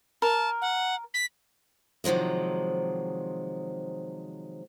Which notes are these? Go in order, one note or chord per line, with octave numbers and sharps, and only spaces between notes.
A#4 A5
F#5
B6
C3 D#3 F3 F#3 G#3